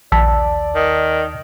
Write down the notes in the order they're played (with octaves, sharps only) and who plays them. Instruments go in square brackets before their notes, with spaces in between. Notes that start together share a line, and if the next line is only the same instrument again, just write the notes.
[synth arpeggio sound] A#1 E6 B6 [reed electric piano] D#2 A5 [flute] D5
[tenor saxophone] D#3